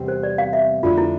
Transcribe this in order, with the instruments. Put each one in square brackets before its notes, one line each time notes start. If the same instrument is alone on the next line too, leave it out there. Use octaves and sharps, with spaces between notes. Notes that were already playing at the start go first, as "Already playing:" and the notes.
Already playing: [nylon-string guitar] E2 C3 G3 C4
[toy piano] C5
D5
F5
E5
[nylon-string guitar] F2 D3 A3 D4 [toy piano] F4
[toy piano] E4